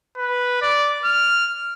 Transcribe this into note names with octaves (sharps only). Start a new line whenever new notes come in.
B4
D5
F6